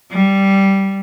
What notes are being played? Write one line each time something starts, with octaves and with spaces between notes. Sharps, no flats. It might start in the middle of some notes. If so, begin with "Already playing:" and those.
G3